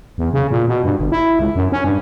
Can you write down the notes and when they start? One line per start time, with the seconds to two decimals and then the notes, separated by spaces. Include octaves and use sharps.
0.18 E2
0.33 C#3
0.51 A#2
0.68 B2
0.84 G2
0.99 G1
1.12 E4
1.39 C#2
1.56 F#2
1.72 C#4
1.84 G2